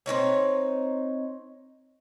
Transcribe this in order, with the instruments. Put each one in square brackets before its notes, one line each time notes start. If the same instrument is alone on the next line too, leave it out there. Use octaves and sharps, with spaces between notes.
[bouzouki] C4 C#4 D#4 C#5